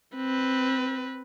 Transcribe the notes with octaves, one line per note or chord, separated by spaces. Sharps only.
C4 B4